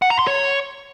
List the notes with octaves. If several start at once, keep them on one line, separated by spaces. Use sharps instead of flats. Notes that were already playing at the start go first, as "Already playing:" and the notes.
F#5
A#5
C6
C#5